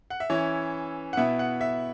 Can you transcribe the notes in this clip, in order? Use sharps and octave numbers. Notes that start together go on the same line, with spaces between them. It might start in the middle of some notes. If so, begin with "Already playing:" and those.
F#5
E5
E3 C#4 E4 C#5
F#5
B2 B3 E4 E5
F#5
E5